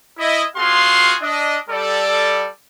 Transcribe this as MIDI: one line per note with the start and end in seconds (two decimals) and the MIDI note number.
0.18 0.43 64
0.18 0.43 75
0.56 1.15 60
0.56 1.15 65
0.56 1.15 66
0.56 1.15 68
0.56 1.15 77
0.56 1.15 84
1.21 1.58 62
1.21 1.58 75
1.70 2.47 55
1.70 2.47 69
1.70 2.47 74